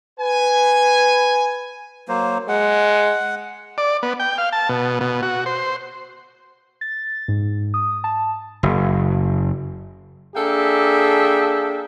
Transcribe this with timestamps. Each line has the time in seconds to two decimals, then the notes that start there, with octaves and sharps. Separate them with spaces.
0.19 B4 G#5
2.09 F#3 A#3 C5
2.49 G#3 F#5
3.78 D5
4.03 B3
4.20 G5
4.38 F5
4.52 A5
4.69 B2
5.01 B2
5.22 F#4
5.46 C5
6.81 A6
7.28 G#2
7.74 D#6
8.04 A5
8.63 F#1
10.35 A#3 D4 G#4 A4 E5 G5